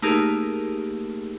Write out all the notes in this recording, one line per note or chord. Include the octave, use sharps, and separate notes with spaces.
A3 A#3 D#4 G4 G#4 A#4